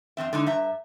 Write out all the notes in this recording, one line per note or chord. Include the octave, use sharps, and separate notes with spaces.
F2 E3 C4 E5
D3 G#3 D#4
G2 E5 A#5